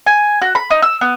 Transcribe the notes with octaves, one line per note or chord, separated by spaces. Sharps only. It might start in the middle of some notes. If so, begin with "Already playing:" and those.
G#5
F#4
B5
D#4
E6
B3